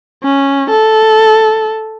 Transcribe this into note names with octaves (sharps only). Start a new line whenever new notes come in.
C#4
A4